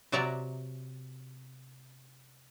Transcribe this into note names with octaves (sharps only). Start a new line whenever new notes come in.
C3 F#3 D5 E5 F#5 A#5